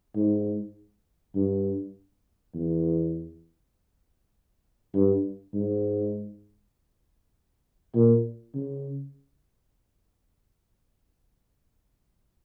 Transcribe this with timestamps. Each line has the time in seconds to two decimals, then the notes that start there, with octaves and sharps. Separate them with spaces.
0.16 G#2
1.35 G2
2.54 E2
4.95 G2
5.54 G#2
7.95 A#2
8.55 C#3